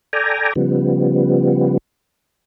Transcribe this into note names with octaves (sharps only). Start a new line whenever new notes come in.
A4 D5 G5 G#5 A#5
C#3 F3 G3 B3